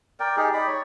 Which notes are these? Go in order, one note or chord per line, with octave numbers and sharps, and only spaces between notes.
A#4 D5 G5
D#4 G4 G#4
D#4 D5 B5
C#5